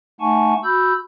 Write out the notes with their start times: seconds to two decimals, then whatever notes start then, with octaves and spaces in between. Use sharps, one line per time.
0.20 A3 D#4 F#5 G#5 A5 C#6
0.64 F#4 B5 E6 G6